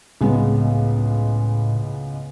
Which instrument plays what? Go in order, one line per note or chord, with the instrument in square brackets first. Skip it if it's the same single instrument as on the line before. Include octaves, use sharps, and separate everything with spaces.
[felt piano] C#2 G#3 B3 [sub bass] A2